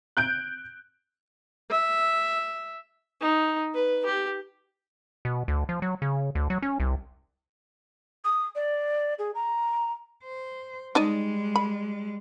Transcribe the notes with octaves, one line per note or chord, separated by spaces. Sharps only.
F#6 G6 D7
E5
D#4
B4
G4
B2
D2
F3
F#3
C#3
D2
F#3
C#4
C2
D#6
D5
G#4
A#5
C5
G3 G#3 D#4 D5 D#5
B5